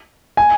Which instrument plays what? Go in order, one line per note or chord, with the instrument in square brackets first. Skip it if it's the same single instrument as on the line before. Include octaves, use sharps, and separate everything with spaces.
[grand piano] G#5